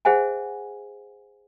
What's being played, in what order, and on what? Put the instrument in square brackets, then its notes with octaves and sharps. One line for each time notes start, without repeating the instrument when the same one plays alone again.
[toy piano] G#4 C5 E5 F#5 G#5